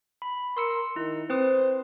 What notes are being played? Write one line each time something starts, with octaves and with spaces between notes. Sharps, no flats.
B5
A#4 C6 E6 C#7
D#3 E4
C4 B4 C5 D#6